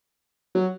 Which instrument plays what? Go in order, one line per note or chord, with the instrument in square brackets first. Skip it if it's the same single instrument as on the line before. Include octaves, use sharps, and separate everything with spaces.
[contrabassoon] F#3